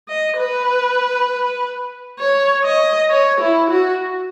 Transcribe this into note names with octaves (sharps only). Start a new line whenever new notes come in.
D#5
B4
C#5
D#5
C#5
E4
F#4